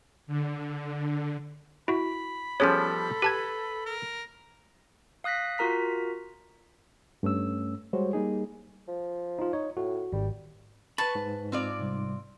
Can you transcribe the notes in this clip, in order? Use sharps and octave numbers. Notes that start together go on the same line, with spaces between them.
D3
E4 F#4 B5
F3 G3 B3 C#4 G#4 A4 C#5
G4 B4 A5 G#6
A#4
F5 D#6 F#6 A#6 B6
F4 F#4 A#4 A#5 B6
G2 A3 C#4 E6
G3 G#3 F#4 C5 C#5
G3 A#3 D#4 G#4
F3
D#4 F4
D#4 C#5
A2 F#4
G#1 G3
B4 A5 B5 C#6
G#2
C4 F4 D5
C2